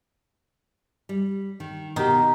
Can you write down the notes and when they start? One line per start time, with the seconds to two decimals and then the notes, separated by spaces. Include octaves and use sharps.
1.09 G3
1.60 D#3
1.96 B2 D#3 D#4 G4